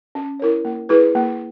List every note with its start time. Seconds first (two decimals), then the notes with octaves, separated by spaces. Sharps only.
0.15 C#4
0.40 E4 A#4 C#5
0.65 A#3
0.89 E4 G#4 B4
1.15 A#3